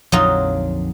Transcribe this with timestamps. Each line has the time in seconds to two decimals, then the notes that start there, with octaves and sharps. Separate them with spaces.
0.12 A#1 F2 D3 F#3 D#4 F4